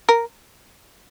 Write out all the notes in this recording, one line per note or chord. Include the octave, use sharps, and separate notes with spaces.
A#4